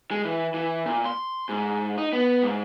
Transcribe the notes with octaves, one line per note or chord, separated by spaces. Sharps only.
G#3
E3
E3
A#2
C6
G#2
D#4
B3
G#2